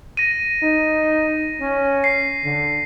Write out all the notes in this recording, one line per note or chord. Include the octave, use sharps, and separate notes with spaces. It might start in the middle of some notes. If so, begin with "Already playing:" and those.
A#6 D#7
D#4
C#4
C7
D3